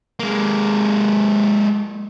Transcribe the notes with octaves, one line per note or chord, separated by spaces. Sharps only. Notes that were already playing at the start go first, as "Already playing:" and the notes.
G#3 A#3